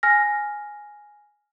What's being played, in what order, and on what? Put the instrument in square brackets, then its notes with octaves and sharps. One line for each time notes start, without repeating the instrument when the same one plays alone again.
[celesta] G#5 F6 A#6